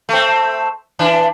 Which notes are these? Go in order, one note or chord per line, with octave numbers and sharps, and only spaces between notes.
A3 C4
E3 D4